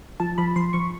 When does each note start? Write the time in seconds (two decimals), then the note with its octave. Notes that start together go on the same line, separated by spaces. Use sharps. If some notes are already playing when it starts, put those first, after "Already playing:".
0.20 F3 A5
0.38 F3 B5
0.56 F3 C6
0.73 F3 C#6